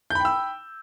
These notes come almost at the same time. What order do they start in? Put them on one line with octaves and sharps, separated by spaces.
G6 B5 G5 E6